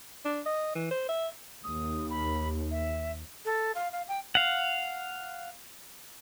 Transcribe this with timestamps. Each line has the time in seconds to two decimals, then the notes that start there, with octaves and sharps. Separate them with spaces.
0.25 D4
0.46 D#5
0.76 E3
0.91 C5
1.09 E5
1.64 D#2 D#6
2.10 B5
2.71 E5
3.45 A4
3.75 F5
3.92 F5
4.08 G5
4.35 F5 F#5